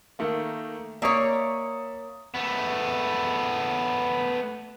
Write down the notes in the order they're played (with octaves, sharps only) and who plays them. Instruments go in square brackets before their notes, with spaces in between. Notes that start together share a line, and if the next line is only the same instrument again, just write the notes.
[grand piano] D#3 A3 A#3
[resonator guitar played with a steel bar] A#3 C#5 [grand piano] D5 E5 D#6
[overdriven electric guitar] A3 B3